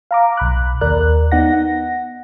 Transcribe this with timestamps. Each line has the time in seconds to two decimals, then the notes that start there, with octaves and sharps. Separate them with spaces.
0.11 F5 A#5 D6
0.37 B1 B5 F#6
0.81 D#2 A#4 D5 F#6
1.31 B3 D#4 F#5 A#6